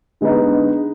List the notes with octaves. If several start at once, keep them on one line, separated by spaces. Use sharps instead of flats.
D3 G#3 B3 D#4